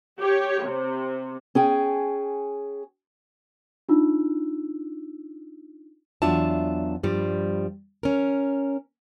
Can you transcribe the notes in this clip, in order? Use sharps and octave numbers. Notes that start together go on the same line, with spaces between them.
G4 C#5
C3
C#4 G#4 G5
D4 D#4 F4 E6
E2 F#3 D4 F4 E5 A5
G2 F3 G3
C#4 A#4